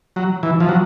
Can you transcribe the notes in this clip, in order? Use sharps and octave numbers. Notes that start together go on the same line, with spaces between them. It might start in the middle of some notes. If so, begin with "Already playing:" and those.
F#3
E3
F3
F#3